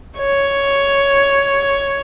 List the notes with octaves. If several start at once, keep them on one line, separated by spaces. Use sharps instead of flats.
C#5